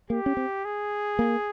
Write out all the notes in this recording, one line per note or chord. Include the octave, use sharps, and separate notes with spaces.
A#3 G4
C#4
C4
G#4
A#3